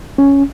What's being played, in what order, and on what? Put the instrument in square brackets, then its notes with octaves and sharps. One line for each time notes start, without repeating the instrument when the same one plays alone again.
[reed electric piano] C#4